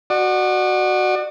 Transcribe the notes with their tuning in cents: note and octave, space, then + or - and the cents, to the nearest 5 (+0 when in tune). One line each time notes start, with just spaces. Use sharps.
F#4 +0 D5 +40